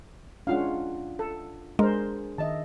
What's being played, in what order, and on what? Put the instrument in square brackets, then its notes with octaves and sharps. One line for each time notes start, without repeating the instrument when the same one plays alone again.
[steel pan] G#3 C#4 F5 [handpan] D4 F4 F#5
[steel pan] A4
[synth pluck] G#3 [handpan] D4 G#4 [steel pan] A#4 C5
[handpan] D#3 D#5 E5 [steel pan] A5